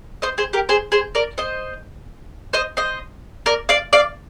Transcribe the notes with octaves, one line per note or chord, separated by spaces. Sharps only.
C5 D#5
G#4 C5
G4 A#4
G#4 C5
G#4 C5
A#4 D5
C5 D#5
C5 D#5
C5 D#5
A#4 D5
D5 F5
D5 F5